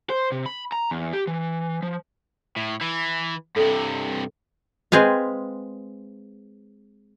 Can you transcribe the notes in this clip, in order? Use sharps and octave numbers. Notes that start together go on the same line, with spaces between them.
C5
C3
B5
A#5
E2
G4
E3
F3
A2
E3
G2 C3 A4
G#3 C4 G#4 B4 F5